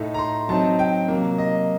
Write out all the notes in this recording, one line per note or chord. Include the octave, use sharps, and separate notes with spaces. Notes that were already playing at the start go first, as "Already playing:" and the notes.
Already playing: A2 A3 D#4
A#5
C6
F#3 C4 D#4 A5
G5
C3 F#3 A#3
D#5